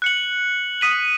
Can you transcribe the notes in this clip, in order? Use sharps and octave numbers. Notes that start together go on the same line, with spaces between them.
F#6 C#7 F#7
D#6 B6 D#7 F#7